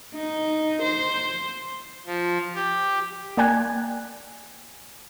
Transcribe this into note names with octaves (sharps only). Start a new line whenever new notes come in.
D#4
C5
F3
G4
A#3 D5 G5 G#5 F#6 G#6